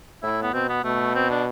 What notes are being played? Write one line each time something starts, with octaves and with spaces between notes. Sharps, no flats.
A2 E4
B3
B2 C4
B3
B2 A3
C4
D4